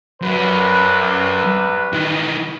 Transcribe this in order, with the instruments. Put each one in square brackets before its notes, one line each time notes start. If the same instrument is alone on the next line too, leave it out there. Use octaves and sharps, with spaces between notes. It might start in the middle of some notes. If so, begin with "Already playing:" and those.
[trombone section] C2 B4 [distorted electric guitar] F#2
[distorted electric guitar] D#3 E3